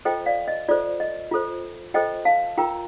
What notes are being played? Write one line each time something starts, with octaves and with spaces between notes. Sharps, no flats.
F4 A4 C5 D#5 G5
D5 F5
D#5
F4 A4 C5 D5
D#5
F4 A4 C5
F4 A4 C5 D#5 G5
F5 A5
F4 A#4 G5 A#5